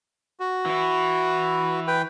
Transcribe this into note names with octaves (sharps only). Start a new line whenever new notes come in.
F#4
E3 E4
B4 G5